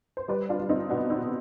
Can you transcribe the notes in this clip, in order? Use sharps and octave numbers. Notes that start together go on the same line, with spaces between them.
C5
G3 B4 D5
D4 F4
G3
C4 D#4
B2 B3 D4
C4 D#4
B2